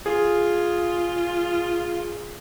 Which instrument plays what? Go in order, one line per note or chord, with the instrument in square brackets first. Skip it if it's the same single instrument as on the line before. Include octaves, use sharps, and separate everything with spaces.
[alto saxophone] F4 [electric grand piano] G#4